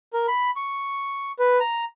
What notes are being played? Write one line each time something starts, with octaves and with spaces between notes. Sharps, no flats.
A#4
B5
C#6
B4
A#5